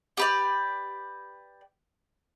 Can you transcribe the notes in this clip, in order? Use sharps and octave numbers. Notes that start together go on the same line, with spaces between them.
G4 B4 D5